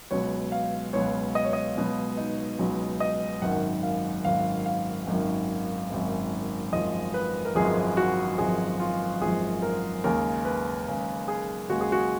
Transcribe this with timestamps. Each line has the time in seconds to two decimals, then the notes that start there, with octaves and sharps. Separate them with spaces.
0.11 C#2 B2 F#3 C#5
0.52 F5
0.93 C#2 B2 F#3 C#5
1.35 D#5
1.44 C#5
1.53 D#5
1.77 C#2 B2 F#3
2.17 D#4
2.59 C#2 B2 F#3
3.00 D#5
3.42 G#1 F#2 D#3 F#5
3.83 F5
4.25 G#1 F#2 D#3 F5
4.66 F5
5.07 G#1 F#2 D#3
5.90 G#1 F#2 D#3
6.72 G#1 F#2 F3 G#3 D#5
7.14 B4
7.45 A#4
7.55 G#1 F#2 F3 G#3 G#4
7.97 F#4
8.38 G#1 F#2 F3 G#3 G#4
8.80 F4
9.21 G#1 F#2 F3 G#3 G#4
9.62 A#4
10.04 D#2 C#3 G#3 A#4
10.45 B4
10.87 D#2 C#3 G#3
11.28 G#4
11.69 D#2 C#3 G#3 F#4
11.81 G#4
11.92 F#4